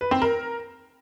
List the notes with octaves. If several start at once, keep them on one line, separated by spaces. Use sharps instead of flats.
B4
C4
A#4